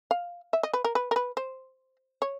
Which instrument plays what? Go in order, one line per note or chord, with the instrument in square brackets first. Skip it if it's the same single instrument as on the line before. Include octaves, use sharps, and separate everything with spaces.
[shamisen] F5
E5
D#5
B4
A#4
B4
A#4
B4
C5
C#5